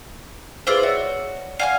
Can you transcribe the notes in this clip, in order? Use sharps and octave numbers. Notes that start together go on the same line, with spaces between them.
E4 F4 G#4 B4 C5 D5
F#4 C#5 D5 E5
D5 F5 F#5 G#5 F6